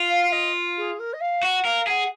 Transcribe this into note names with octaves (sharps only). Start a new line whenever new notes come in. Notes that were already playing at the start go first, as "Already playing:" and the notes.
Already playing: F4
F5
D#5
G#4
A#4
D#5
F5
F#4 F#5
A#4 F5
G#4 F#5